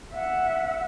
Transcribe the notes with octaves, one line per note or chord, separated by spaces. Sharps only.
E5 F#5